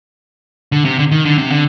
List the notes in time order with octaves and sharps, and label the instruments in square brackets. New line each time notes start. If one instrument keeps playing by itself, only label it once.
[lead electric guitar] D3
C3
D3
D#3
D3
C3
D3